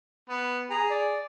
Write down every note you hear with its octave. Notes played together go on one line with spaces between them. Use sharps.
B3
G#4 A#5
D5